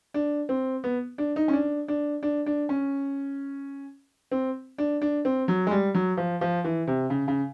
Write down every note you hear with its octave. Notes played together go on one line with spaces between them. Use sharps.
D4
C4
B3
D4
D#4
C#4
D4
D4
D4
D4
C#4
C4
D4
D4
C4
F#3
G#3
G3
F#3
F3
F3
E3
C3
C#3
C#3